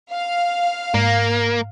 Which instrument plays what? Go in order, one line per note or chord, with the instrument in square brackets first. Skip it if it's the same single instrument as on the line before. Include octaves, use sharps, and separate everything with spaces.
[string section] F5
[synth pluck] G#2 [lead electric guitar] A#3